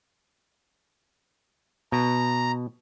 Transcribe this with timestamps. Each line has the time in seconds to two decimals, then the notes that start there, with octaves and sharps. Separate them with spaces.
1.92 B2 A#5